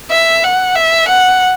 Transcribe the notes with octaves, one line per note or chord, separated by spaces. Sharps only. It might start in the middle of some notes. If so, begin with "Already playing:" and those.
E5
F#5
E5
F#5